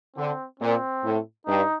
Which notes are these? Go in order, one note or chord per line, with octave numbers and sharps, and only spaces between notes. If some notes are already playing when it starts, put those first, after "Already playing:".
D3 C4
A#2 C4
A2
G2 D#4